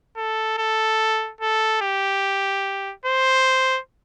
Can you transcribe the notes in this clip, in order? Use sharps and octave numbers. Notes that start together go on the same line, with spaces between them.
A4
A4
A4
G4
C5